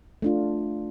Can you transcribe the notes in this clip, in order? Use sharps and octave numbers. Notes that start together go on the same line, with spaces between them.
A3 D4 F4